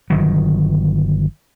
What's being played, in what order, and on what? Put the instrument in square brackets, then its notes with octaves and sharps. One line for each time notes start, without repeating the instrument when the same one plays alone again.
[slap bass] G1 D#3 F#3